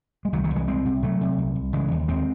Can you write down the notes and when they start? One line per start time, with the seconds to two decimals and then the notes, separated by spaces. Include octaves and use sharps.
0.25 G#3
0.32 C2 D#3 F#3
0.44 D#3 F#3
0.50 C2
0.56 E3 G#3
0.67 C2 G#3 C4
0.85 C3
1.02 C3 F#3 A3
1.21 C3
1.38 C2
1.55 C2
1.73 C#3 E3 G#3
1.91 D#2
2.08 D#2 G#3 C4